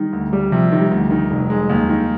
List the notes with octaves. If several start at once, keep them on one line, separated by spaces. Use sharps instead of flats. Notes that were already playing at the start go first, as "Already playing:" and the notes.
Already playing: D#3 G3
D2
G3
C3 F3
D#3
G3
D2
D#3
F1
G#3
D#2
D#3